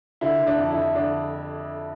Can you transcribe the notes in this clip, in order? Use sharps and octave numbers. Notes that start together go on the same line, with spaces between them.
D3 E4
D3
D4
F2
E4
F2
D3 D4